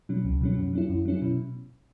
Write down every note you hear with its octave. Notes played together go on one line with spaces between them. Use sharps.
B2 F#3 C#4
C#2
B2 F#3 C#4
F#2
F#3 C#4 E4
F#2
F#3 C#4 E4
B2